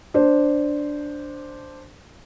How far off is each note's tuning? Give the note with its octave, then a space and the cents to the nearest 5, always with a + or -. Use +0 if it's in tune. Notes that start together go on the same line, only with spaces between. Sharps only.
D4 +0 C5 +0